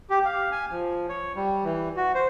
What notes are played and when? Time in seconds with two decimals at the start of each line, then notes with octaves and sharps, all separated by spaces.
0.10 G4
0.25 F5
0.52 G#5
0.71 F3
1.09 C#5
1.36 G3
1.65 E3
1.96 F#4
2.15 C5